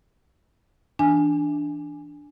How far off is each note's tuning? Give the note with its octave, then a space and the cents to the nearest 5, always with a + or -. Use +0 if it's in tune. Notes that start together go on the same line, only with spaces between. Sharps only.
E3 +0 D4 +0 G#5 +0